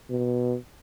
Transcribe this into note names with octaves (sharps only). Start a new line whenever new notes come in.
B2